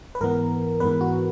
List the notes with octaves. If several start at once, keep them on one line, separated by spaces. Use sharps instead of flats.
B4
G#2 E3 B3 A#4
G#2 E3 B3 B4
F#4